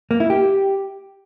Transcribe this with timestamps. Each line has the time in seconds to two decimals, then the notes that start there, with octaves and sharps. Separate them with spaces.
0.11 A#3
0.20 E4
0.30 G4